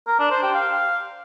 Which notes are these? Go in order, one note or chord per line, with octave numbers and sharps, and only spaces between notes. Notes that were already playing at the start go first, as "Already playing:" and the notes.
A#4
D4
C5
G4
F5